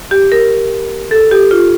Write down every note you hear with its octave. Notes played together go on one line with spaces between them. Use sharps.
G4
A#4
A4
G4
F4